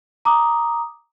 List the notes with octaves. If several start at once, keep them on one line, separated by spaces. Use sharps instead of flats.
A#5 D6 D#6